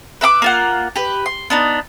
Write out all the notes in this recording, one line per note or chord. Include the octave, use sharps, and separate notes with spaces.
B4 E5 A#5 D6
A#3 F4 F#5
G4 B4
C6
B3 D4 D#4